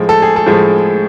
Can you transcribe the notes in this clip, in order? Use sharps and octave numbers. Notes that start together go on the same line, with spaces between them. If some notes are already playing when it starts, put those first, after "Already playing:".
Already playing: A2 F3 G#3
A4
G#4
A4
A2 F3 G#3